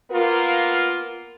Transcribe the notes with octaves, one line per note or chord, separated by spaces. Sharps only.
A#3 B3 F4 A#4